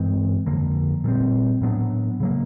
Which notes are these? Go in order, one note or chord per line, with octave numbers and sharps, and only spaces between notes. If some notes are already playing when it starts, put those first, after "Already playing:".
Already playing: G2 E3 G#3 C4
F2 D3 F3 A#3
A#2 G3 C4
A2 F#3 B3 D4
C#3 F#3 A#3